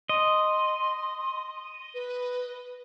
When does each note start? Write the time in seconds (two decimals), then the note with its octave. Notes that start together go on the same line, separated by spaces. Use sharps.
0.09 D#5 C6
1.94 B4